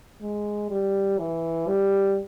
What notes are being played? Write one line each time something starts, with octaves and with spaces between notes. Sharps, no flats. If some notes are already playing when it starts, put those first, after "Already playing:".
G#3
G3
E3
G3